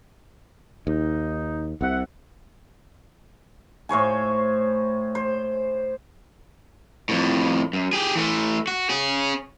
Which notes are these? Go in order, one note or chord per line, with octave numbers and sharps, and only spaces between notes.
D#2 D#4
C2 C3 E5 F#5
A2 C5 C#5 G#5
C5
F2 A2
F#2
G4 G#4
E3 A3
F#4
C#4 G#4